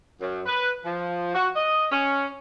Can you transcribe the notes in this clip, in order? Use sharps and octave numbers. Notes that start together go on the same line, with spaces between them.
F#2
B4
F3
F#4
D#5
C#4